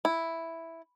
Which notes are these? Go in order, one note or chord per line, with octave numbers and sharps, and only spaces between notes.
E4